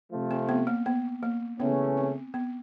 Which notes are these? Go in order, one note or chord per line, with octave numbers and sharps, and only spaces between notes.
C3 F3 A3
C4
B3
A#3
B3
A#3
C#3 E3 A3 B3 C#4
C4
B3